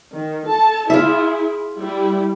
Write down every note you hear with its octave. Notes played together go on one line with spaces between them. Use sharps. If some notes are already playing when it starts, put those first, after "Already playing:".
D#3
A4 A5
E4 F4 G#4 E5
G3 E4 G4